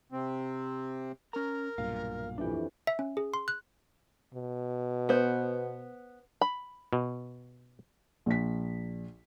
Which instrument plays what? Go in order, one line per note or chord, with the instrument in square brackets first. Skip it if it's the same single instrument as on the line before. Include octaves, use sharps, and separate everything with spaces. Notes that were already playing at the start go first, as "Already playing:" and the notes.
[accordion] C3 C4
[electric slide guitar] C#4 A#5 [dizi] A#4
[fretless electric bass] B1 G2 A#2 [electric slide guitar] F5
[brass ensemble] F2 E3 [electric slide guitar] D4 G4
[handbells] E5
C#4
G#4
C6
F#6
[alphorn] B2
[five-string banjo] B3 C5
B5
[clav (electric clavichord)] B2
[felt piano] A#1 B6